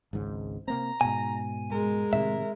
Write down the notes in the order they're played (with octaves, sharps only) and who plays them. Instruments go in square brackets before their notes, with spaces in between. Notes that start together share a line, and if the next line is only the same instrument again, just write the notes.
[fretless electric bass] G#1 C#2 G#2
[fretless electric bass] C3 A#3 C4 [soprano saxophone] A#5
[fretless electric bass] G#2 B2 [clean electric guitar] G#5
[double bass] G#3 [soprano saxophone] A#4
[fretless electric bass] A2 C3 D#3 [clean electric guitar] E5